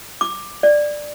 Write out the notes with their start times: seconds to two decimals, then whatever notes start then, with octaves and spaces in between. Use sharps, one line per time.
0.21 D6
0.63 D5